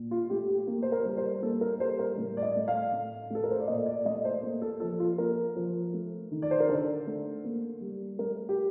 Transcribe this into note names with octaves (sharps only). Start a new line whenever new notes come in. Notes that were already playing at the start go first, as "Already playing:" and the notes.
Already playing: A#2
F4
A3 G4
G4
A#3
C5
A#4
G3
C5
A#3 A4
A#4
G3 C5
A#4
A2
D5
D#5
A3
F5
A2
A3 A4
A#4
C5
D5
A#2 D#5
D5
A3 D#5
C5
A#3
A4
F3 A4
F4
A#3 A#4
F3
A3
D#3
D5
C5
A#4
D3 A4
A3
A#3
G3
A3 A#4
G4